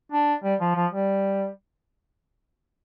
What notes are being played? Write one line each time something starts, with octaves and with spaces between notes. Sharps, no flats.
D4
G3
F3
F3
G3